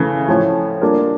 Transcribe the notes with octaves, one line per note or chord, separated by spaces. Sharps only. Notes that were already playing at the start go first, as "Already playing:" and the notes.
Already playing: C#3 E3 A3
A2 F3 A3 C#4
G3 A#3 D4 F4 A#4